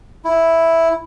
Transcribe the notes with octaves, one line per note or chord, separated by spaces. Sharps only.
E4